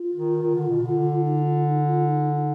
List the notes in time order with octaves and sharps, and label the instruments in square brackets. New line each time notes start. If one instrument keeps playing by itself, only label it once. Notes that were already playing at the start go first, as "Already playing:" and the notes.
Already playing: [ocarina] F4
[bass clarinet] D#3
D#3
D3
B2
D3
[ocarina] D#4
F4
D#4
F4
D#4
D#4